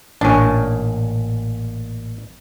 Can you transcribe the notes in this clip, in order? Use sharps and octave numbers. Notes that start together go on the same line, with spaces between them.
A1 A#2 C#4 D4